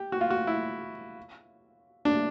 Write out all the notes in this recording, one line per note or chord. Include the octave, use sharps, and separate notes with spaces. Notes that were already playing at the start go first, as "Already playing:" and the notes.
Already playing: G4
F#4
F4
F#4
E4
D4